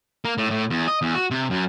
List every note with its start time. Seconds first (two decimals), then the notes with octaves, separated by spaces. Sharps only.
0.25 A#3
0.38 A2
0.50 A2
0.70 E2
0.88 D#5
1.02 E2
1.15 F#4
1.31 C3
1.50 F#2